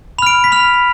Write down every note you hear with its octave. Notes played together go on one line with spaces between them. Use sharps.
B5 F6 D7 F7
B6
B5 F6 F7